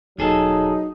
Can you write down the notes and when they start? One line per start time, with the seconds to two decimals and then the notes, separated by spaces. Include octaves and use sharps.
0.18 D#1 B1 F#3 D#4 G#4 A4